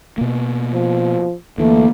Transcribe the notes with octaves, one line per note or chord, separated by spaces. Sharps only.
B2 A#3
F3
D2 E3 A3 A#3